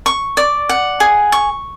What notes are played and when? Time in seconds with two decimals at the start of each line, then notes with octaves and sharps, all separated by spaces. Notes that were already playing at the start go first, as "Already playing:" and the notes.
0.06 C#6
0.37 D5
0.69 F#5
1.00 G#4
1.32 C#6